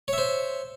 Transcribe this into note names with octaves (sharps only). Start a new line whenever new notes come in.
C5 C#5 E5